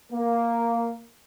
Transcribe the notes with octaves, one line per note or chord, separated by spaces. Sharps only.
A#3